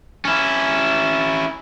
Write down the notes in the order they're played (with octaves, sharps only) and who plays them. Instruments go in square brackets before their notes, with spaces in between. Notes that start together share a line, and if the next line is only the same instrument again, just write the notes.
[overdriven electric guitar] C#4 E4